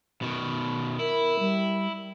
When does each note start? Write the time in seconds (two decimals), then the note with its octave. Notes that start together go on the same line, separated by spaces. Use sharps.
0.22 B2 D#3
0.99 E4 A#4
1.40 G3